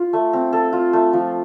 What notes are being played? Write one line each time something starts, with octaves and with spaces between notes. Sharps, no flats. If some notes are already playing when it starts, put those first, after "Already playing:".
Already playing: F4
A3
C4
A4
F4
A3
F3